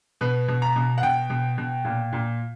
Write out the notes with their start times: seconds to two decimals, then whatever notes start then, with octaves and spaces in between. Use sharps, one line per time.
0.21 B2 B4
0.48 B2
0.62 A#5
0.76 B2
0.98 F#5
1.02 B2 G5
1.30 B2
1.58 B2
1.85 A#2
2.13 A#2